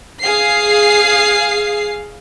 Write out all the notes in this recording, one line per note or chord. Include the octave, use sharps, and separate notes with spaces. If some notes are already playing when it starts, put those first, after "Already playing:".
G#4 F5 C7